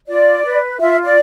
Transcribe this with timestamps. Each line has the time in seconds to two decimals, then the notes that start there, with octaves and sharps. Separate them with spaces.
0.08 F4 D5
0.44 B4
0.80 F4 E5
1.04 D5